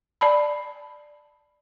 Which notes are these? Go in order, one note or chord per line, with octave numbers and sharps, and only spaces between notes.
D5 A5 B5